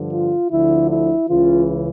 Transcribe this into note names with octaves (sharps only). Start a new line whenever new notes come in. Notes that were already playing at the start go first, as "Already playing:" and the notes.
Already playing: G2 D3 F3
F4
D2 D3 F3 E4
E4
C#2 C#3 E3 F4